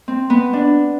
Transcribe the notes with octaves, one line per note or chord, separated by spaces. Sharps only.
C4
B3
D4